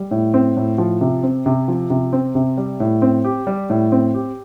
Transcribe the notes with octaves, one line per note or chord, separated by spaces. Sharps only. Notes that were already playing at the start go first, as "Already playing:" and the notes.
Already playing: G3
A2
C4
A2
F3
C3
C4
C3
F3
C3
C4
C3
G3
A2
C4
G4
G3
A2
C4
G4